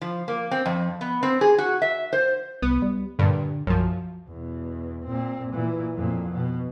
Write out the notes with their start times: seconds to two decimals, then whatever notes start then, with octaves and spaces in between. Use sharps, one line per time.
0.01 F3
0.28 A#3
0.51 C4
0.66 F2
1.01 B3
1.23 C4
1.41 G#4
1.58 F#4
1.82 E5
2.13 C5
2.62 C2 B3
2.82 G3
3.19 G2 A#2 D3
3.67 B1 F#2 F3
4.28 E2 B2
5.05 A#2 C4
5.53 A#2 E3
5.96 F2 A#2
6.34 B2